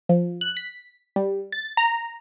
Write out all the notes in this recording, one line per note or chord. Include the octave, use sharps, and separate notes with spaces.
F3
F#6
B6
G3
A6
A#5